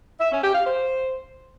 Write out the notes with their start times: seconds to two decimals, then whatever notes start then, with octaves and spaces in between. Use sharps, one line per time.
0.20 E5
0.32 C#4
0.43 G4
0.54 F5
0.66 C5